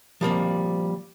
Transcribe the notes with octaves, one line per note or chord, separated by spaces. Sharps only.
F3 G3 A#3 C4